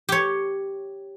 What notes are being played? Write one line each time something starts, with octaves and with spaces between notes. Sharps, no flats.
G4 C#5